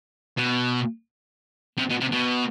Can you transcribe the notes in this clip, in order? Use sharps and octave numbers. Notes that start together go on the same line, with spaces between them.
B2
C3
B2
C3
B2